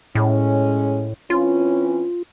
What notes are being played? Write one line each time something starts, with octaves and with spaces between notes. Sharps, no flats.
A2 G#3 C#4
E3 C4 C#4 F4